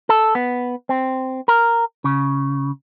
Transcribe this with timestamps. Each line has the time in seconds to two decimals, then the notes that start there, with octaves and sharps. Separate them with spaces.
0.09 A4
0.35 B3
0.89 C4
1.48 A#4
2.04 C#3